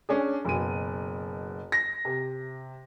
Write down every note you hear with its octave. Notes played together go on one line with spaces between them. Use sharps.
C#4 D4 G#4
F#1 B2 D#7
A#6
C3